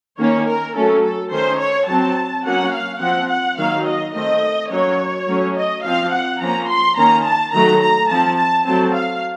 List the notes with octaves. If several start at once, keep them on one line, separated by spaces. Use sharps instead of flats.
D#3 A#3 C#4 C#5
A#4
F#3 A3 C#4 A4
A4
D#3 A3 C#4 C5
C#5
F#3 C4 A5
F#3 A#3 C#4 F#5
F5
F3 C4 F#5
F#5
D#3 F#3 A#3 F5
D#5
D#3 A3 C4 D#5
F#3 A#3 C#4 C#5
F#3 A3 C#4
D#5
F3 C4 F5
F#5
F3 A#3 C#4 A#5
C6
D#3 A#3 C#4 A#5
A5
D#3 F#3 A3 A#5
A#5
F3 C4 A5
A5
F#3 A3 C4 A5
F5